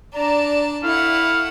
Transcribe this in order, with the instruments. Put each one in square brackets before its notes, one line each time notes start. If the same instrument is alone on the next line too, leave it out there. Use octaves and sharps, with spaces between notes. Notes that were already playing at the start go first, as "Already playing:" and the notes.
[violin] D4 A5 [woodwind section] D5 A#5
[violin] A3 F#5 [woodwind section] E4 [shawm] F5